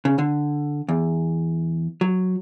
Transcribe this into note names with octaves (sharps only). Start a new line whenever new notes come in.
C#3
D3
E2
F#3